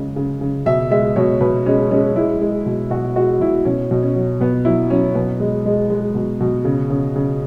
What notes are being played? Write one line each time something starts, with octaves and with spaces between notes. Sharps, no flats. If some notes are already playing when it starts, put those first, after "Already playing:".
Already playing: C#3 G#3
C#3
C#3
B2 E5
G#3 E5
B2 C#5
B2 B4
G#3 C#4
G#3 C#4
G#3 E4
G#3
B2
B2 F#4
G#3 F#4
B2 E4
B2 C#4
B2
C#4
F#3
B2 B3
F#3 E4
F#3 C#4
B2 B3
G#3
G#3
G#3
B2
B2
C#3
C#3
C#3